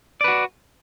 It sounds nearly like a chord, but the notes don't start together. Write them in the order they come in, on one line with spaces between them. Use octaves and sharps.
D5 B4 F#4